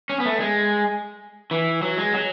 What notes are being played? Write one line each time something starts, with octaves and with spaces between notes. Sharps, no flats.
C#4
B3
A3
G#3
E3
F#3
G#3
F#3